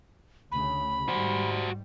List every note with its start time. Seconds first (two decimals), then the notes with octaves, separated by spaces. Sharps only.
0.52 D2 C#3 B5
1.09 G#2 G3 F#4 C5